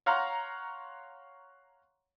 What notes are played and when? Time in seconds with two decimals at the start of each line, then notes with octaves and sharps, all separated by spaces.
0.06 C#5 F5 F#5 A#5 C6